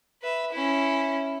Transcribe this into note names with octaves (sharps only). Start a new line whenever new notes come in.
B4 E5
C#4 E4